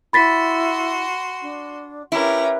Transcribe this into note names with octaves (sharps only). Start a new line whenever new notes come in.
E4 F#4 B5 C6 A6 B6
D4
C#4 E4 G4 A#4 B4